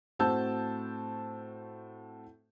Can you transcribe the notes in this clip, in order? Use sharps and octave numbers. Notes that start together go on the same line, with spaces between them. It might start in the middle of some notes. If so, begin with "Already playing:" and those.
A2 C4 F#4 A5 E6 G6